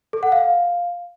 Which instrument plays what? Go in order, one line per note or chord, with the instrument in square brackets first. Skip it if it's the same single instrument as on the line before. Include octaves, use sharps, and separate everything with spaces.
[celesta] A4
F#5
F5